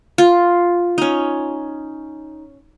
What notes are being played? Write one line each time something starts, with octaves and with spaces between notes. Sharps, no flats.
F4
C#4 D#4